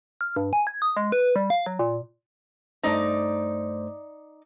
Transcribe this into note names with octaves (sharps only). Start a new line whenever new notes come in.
F6
G2
G#5
G#6
D#6
G#3
B4
G3
F5
F#3
A#2
G2 A3 D#4 C5 D5